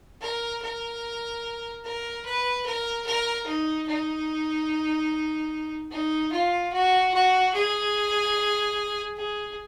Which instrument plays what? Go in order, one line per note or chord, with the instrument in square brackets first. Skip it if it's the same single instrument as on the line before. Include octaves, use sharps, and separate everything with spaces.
[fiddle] A#4
A#4
A#4
B4
A#4
A#4
D#4
D#4
D#4
F4
F#4
F#4
G#4
G#4